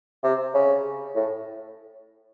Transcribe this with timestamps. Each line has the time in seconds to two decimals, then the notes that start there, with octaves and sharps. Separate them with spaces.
0.24 C3
0.54 C#3
1.16 A2